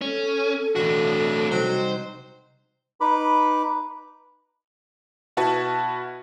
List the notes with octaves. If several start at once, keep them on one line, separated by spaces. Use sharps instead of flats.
C#4 A4
E1 A2 D4 F#4 A#6
C3 F#3 G3 D#4 C5
D#4 B4 B5 D6
B2 E4 F#4 B4 A5